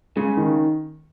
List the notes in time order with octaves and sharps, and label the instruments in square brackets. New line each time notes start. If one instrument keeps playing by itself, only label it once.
[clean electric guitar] C#3 [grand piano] G#3
[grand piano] D#3